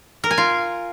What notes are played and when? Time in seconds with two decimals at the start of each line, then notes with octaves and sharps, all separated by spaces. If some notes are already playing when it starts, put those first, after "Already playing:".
0.24 A#4
0.31 G#5
0.38 F4